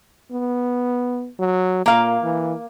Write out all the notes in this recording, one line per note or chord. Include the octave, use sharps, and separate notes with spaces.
B3
F#3
A#2 A#3 F5
E3